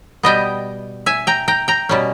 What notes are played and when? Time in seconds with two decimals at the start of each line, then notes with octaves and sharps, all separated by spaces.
0.23 B2 G3 B3 D#5 G5
1.06 E5 G#5
1.27 G5 A#5
1.48 G5 A#5
1.68 G5 A#5
1.89 B2 G3 C#4